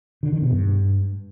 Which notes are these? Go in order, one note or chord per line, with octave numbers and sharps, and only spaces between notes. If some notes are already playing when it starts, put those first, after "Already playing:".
D3
D#3
B2
G2